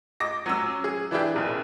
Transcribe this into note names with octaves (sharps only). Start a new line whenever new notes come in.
D#5 D6 A#6
F#3 C#4 E6
G#4
E3 D4 E4 G4 G#4
F#1 B1 C#3